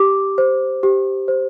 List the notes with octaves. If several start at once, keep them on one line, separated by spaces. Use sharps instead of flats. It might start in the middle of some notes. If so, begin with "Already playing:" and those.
Already playing: G4 D6
C5
G4
C5